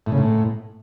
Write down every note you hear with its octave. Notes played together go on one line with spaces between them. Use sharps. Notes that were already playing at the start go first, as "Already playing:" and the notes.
A2
C#3
A2